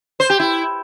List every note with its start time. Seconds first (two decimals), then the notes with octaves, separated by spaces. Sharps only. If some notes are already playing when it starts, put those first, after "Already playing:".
0.20 C5
0.30 G4
0.40 E4